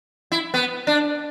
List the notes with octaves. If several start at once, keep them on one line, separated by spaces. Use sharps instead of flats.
E4
B3
D4